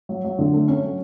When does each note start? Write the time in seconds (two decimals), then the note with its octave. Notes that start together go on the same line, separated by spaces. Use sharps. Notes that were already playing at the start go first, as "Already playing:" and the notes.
0.09 F#3
0.24 F#3
0.39 D3
0.54 A3
0.68 C#4
0.83 F#3